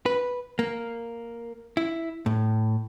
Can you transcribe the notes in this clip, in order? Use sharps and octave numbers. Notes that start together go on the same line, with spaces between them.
B4
A#3
E4
A2